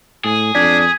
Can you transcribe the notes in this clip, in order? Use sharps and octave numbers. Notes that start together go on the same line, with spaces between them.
A2 G#4
F2 D4 G#6 B6